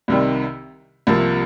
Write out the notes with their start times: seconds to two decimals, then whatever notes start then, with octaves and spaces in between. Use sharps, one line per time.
0.08 C2 C3 D#3 G3
1.07 C2 C3 F3 A#3